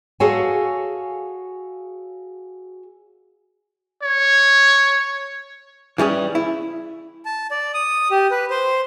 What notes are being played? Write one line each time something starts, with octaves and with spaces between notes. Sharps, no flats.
F#4 G#4 A4 C#5 F5 G#5
C#5
E3 G3 C#4 G#4
E4
A5
D5
D#6
G4
B4
C5